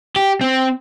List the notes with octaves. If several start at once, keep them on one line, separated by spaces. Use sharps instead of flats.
G4
C4